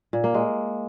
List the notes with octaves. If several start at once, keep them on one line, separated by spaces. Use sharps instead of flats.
A#2
A#3
G#3